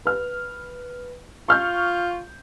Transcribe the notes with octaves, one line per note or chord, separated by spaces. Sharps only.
B4 F6
F4 C#6 F6 G6